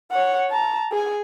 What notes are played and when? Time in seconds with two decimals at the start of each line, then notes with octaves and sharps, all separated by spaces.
0.12 C#5 F#5
0.50 A5 A#5
0.92 G#4 G#5